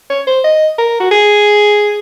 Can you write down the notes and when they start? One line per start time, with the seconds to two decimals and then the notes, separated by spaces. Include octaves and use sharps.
0.10 C#5
0.27 C5
0.44 D#5
0.78 A#4
1.00 F#4
1.11 G#4